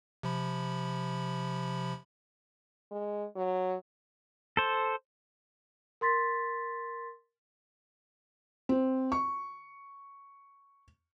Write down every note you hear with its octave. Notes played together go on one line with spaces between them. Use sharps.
C3 F3 B5
G#3
F#3
A4 C5
A#4 C6 A6 B6
C4
C#6